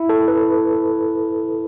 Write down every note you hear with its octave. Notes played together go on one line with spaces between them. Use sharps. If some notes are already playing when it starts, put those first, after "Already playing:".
Already playing: E4
A4
B4